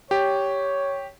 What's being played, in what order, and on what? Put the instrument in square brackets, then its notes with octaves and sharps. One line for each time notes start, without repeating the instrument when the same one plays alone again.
[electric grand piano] G4 [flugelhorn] C#5